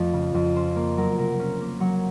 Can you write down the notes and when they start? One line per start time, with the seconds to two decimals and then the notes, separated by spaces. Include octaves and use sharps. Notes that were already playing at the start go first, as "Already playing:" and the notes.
Already playing: F2 F3 A3
0.13 C#3
0.34 F2
0.56 C#4 C5
0.76 A#3
0.97 F#3 A#4
1.18 C3 A#4
1.39 C#4
1.61 A#3
1.80 F#3 C#5